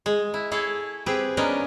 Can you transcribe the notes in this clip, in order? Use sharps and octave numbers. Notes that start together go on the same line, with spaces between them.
G#3
E4
E4 G#4 A4 C#5
C4 G4 G#4 B4
F#3 B3 C#4 D4 A#4 D#5